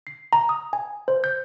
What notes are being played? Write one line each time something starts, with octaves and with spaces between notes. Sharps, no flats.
C7
A#5
D#6
G#5
C5
G6